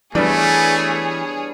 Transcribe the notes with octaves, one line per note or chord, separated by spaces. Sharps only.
E3 G3 A3 B3 D4 G#4 C#5